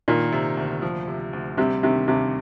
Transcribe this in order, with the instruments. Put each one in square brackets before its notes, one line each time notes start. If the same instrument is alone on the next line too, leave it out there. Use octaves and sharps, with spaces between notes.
[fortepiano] A#2 [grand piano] D#3
[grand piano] C3
D2
F3
C3
D2
[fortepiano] C3 [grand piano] G3
[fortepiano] C3 [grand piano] D#3
[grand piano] D#2 [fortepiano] C3